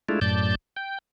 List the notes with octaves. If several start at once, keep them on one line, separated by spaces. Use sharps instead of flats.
G#3 A3 D4 E4 F4
F#2 A2 D5 A5 G6
G5